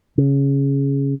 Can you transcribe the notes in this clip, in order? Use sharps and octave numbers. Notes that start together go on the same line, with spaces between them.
C#3